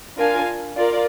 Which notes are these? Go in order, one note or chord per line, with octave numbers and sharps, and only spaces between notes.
D4 F4 A#4 F5 G#5
F4 A#4 D5